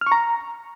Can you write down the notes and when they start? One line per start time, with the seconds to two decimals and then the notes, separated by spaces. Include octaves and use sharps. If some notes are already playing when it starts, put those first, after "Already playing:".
0.01 F6
0.07 C#6
0.12 A#5